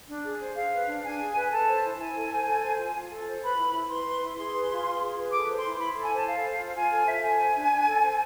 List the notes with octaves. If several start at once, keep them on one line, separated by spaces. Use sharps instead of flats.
D4
G#4
C5
G#4 F5
B4
D4
D4 G#5
G#4
B4
A4 A5
C5
E4
E4 G#5
A4
C5
A4
C5
F4
F4
A4
C5
B4 B5
E4
E4
B4 C6
B4
E4
G#4 C6
B4
F4
F4
G#4
B4
A4 D6
C5
C6
E4
E4 B5
A4
G#5
C5 A5
A4 F5
C5
F4
F4 G#5
A4 G#5
C5 E5
A4 G#5
C5
D4
D4
A4
C5